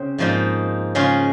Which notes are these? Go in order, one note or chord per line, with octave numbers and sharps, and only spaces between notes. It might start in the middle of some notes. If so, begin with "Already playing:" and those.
Already playing: C#3 C4 C5
G#2 F3 A#3 D#4
C#3 G#3 C#4 F4